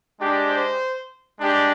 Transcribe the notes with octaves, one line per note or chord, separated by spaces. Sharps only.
G#3 D4 G4
C5
G#3 D4 G4